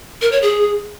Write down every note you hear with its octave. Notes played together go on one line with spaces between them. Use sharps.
A#4
C#5
G#4